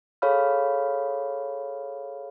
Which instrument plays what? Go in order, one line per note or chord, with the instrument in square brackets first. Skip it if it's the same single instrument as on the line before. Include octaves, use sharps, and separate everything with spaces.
[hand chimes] G#4 A4 C#5 F5 B5 F6